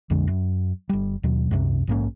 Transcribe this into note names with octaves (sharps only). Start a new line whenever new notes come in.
B1 F2 D3 G#3
F#2
G1 G3
D#2 B2 F#3
C2 F#2 C3
A#1 G#2 A#3 C#4